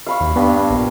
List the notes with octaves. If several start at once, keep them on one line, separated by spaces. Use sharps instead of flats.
F5 B5 C#6
D#2
G2 B3
A#1